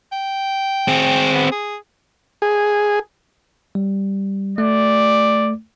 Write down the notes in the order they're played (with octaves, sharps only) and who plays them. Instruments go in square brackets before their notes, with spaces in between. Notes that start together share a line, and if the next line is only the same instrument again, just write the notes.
[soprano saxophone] G5
[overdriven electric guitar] C4 G#4
[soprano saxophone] B3
G#4
[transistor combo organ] G#4
[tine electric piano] G3
[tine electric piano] A3 [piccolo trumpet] D5